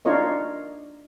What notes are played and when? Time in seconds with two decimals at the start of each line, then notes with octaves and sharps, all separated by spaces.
0.05 D4 D#4 F4 A#4 C#5 D#5